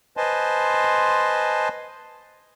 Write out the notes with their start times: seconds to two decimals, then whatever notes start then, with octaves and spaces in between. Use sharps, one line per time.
0.17 B4 C5 D#5 G#5 A5 C6